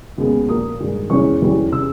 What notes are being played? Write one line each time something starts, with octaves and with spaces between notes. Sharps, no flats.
D#2 C#3 G#3 B3
A#1 A#2 A#3 D#6
G2 D#3 G#3
E2 C#3 G#3 C#4 C#6
E1 E2 D#3 G3 C#4
C#3 E6